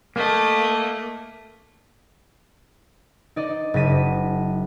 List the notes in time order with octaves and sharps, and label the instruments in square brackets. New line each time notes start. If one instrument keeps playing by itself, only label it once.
[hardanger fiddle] A3 D#5 [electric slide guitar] A#3
[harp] D#4 D5 D#5
F#1 A5 A#6 B6 D#7